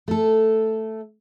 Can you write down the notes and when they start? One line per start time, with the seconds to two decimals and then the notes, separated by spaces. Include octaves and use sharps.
0.08 A3 A4